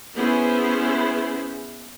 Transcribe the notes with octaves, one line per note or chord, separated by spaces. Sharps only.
B3 C#4 E4 G#4 C5